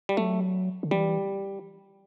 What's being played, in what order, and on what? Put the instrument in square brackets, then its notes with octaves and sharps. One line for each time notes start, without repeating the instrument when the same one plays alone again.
[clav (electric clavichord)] G3
[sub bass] F#3 [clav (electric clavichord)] A3
[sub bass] D3
[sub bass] E3 [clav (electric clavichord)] G3